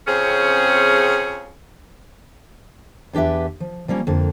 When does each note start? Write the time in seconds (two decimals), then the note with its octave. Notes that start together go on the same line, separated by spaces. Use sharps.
0.07 F2 C#3 C4 C#4 G#4
3.13 E2 D4 G4 B4 E5
3.60 F3
3.88 F3 G3 A#3 C#4 F4
4.07 F2 D3 A#3